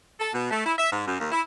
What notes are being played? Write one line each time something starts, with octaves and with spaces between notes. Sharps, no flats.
A4
B2
A3
E4
E5
G#2
F#2
D#2
E4